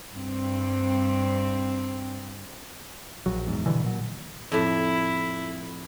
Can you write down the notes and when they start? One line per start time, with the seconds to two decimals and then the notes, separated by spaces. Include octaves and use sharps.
0.12 G2 C4
3.26 A#1 F#3
3.47 E2 G#2
3.66 G2 B2 D3 E3
3.84 A#2 F#3
4.52 F2 A2 E4